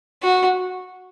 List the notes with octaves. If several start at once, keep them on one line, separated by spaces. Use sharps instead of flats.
F#4